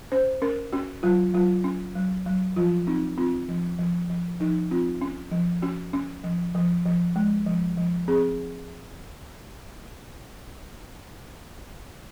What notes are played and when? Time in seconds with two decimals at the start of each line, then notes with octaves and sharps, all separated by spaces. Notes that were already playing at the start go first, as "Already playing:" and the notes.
0.12 C#4 C5
0.42 C#4 A#4
0.73 C#4 F#4
1.03 F#3 F4
1.34 F#3 F4
1.64 C#4
1.95 F#3
2.26 F#3
2.56 F3 F4
2.87 C4 D#4
3.17 C4 F4
3.48 F3
3.79 F3
4.10 F3
4.40 F3 D#4
4.71 C4 F4
5.01 C#4
5.31 F3
5.62 C#4 F#4
5.93 C#4
6.24 F3
6.55 F3
6.85 F3
7.16 G#3
7.46 F3
7.77 F3
8.08 C4 G#4